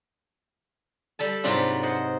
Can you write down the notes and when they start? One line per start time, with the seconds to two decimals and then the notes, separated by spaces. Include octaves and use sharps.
1.19 G3 A4 A5
1.43 G#2 C3 F#3 D4 F4 B4
1.83 C5 D#5 F#5